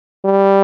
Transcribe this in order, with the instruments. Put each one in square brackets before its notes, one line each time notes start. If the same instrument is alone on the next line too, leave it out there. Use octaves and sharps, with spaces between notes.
[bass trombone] G3